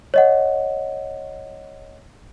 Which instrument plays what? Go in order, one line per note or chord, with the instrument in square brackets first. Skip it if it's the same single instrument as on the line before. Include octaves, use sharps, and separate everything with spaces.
[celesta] C#5 D#5 F#5